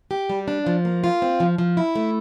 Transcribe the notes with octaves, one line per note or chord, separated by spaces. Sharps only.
G4
G3
D4
F3
A#3
F4
C4
F3
F3
E4
A3